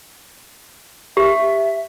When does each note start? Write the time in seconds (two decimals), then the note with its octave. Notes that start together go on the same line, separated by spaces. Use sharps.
1.17 G4 E5